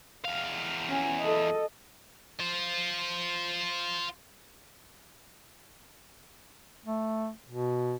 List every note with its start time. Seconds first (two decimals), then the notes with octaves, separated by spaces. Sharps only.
0.25 E2 F5
0.88 C#4 G#5
1.21 A4 D#5
2.40 F4 C5
6.85 A3
7.49 B2